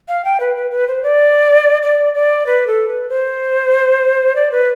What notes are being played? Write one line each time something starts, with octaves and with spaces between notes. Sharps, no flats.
F5
G5
B4
B4
B4
C5
D5
D5
D5
B4
A4
B4
C5
D5
B4